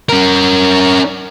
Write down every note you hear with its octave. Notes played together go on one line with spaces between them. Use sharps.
C#4 A#4